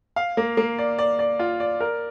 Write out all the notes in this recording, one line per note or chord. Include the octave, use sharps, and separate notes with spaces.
F5
A#3
A#3
D5
D5
D5
F4
D5
A#4